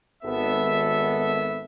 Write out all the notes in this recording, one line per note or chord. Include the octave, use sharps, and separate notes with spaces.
G#1 B3 A4 E5